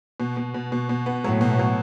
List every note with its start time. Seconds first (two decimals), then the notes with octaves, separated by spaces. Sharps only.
0.20 B2
0.37 B2
0.54 B2
0.72 B2
0.89 B2
1.06 B3
1.24 A2 F#3
1.41 B2
1.59 F#3